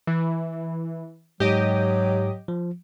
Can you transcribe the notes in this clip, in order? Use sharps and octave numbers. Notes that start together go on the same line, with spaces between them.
E3
G#2 F#3 G4 D#5
F3